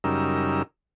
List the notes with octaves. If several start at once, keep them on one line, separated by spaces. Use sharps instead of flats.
F#2 C#3 G3 D#4 A#4 E6